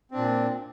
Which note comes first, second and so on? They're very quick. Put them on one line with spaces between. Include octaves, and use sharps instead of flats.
C4 D4 A#2